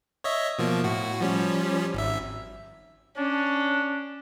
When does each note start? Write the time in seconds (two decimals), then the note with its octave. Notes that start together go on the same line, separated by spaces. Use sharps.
0.24 C#5 D#5 E5
0.59 B2 F3 A#3
0.84 A2 F#4
1.21 F3 G3 C#4
1.94 G#1 E5
3.17 C#4 D4